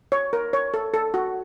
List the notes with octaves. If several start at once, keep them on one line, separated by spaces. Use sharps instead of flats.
C#5
A#4
C#5
A4
A4
F#4